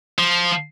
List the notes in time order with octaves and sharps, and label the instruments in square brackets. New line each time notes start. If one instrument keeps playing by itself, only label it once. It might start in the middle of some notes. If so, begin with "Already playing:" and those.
[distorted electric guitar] F3